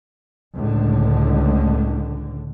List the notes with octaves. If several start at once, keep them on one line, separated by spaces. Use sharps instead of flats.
C#2 A2 D3